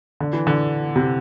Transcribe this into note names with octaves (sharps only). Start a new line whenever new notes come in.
D3
E3
D3
C3